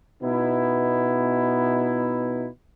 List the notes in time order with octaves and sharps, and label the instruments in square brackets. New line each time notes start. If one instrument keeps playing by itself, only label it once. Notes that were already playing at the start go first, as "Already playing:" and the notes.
[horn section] B2 B3 D#4 E4